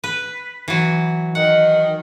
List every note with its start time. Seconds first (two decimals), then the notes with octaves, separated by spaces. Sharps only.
0.04 B4
0.68 E3 F#3
1.35 D#3 F#5